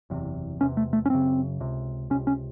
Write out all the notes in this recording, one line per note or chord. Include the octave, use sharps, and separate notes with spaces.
F#1 E2 C3
E1 E2 C3 C#4
A3
A3
C#4
F#1 F#2 C#3 C4
C#2 C3
C#2 C3 C#4
C#4